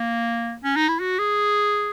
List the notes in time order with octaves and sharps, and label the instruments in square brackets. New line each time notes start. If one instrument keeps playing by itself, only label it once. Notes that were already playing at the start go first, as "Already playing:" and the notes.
Already playing: [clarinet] A#3
C#4
D#4
E4
F#4
G#4